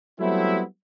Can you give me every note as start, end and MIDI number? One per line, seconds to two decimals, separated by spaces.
0.20 0.63 54
0.20 0.63 55
0.20 0.63 57
0.20 0.63 59
0.20 0.63 60
0.20 0.63 64